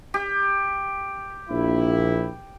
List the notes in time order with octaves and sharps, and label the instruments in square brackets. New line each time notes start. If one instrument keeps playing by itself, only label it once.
[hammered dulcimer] G4
[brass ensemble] A#1 E4